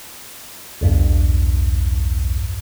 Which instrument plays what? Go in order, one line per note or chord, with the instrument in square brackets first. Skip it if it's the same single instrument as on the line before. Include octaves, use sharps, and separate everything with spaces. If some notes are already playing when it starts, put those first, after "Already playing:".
[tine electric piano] B1 E2 G2